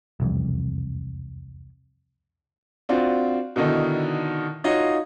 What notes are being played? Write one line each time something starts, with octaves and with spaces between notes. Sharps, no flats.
E1 C2 F2
C4 D4 F4 F#4
B2 D3 D#3 D#4 E4
D#4 F4 F#4 C#5 D#5 F5